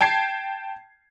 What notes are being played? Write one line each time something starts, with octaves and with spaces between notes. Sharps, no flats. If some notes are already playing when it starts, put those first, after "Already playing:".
G5 A5 G#6 C7